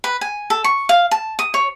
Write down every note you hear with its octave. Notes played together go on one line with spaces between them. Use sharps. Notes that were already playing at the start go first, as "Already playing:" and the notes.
B4
G#5
A4
C#6
F5
A5
D#6
C#5